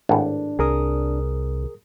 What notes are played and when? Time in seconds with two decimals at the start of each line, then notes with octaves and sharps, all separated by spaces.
0.09 G#1 A2 D4
0.59 C2 G#4 A#4 D#6